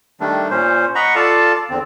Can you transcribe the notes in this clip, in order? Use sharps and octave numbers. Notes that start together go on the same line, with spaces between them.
D#3 G3 A3 D4
A#2 C#4 C5
D#5 F#5 A#5 B5 C#6
F4 A4 D5 F5 A5
E2 D3 C4